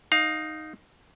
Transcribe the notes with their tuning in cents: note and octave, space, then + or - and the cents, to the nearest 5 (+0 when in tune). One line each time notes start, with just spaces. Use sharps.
D#4 +0 F5 +20